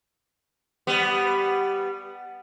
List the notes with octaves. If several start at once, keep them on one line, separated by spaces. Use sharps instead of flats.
G3 B3